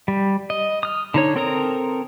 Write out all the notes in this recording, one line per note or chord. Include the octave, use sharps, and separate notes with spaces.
G3
D#5
D#6 F6
D3 D#4 C#5
C4 A4 A#4 A#5 D#6